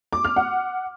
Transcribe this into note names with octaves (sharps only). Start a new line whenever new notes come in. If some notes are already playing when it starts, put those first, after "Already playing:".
D6
F6
F#5